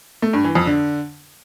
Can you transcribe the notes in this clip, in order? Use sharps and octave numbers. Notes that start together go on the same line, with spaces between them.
A3
G2
E3
F2
D3